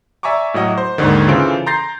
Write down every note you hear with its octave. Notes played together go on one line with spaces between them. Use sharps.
D5 E5 G#5 A#5 C#6 D6
A2 F#3 D#5 F#5
C5
D#2 G#2 D3 D#3
C#3 E3 F4 A4 C5 D7
A#5 C6 G6 A6 A#6 C7